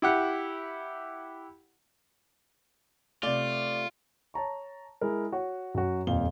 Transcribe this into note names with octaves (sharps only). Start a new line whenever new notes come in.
E4 G4 F#5
C3 A3 F4 D5
C#5 A5 A#5 C#6
G#3 E4 A#4
F#4 C#5 F#5
F#2 F#3 F#4
D#1 F2 A#2 F5 G7